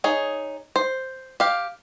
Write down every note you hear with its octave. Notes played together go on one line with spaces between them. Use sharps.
D#4 G#4 C#5
C5
G4 F5